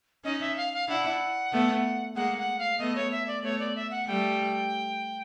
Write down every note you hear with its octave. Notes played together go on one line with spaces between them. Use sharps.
C#4 D#4 D#5
E5
F5
F5
D4 E4 F#5
A3 B3
G#3 A#3 F#5
F#5
F5
A3 B3 D#5
C#5
E5
D5
A3 B3 C#5
D5
E5
F#5
G3 A3 G5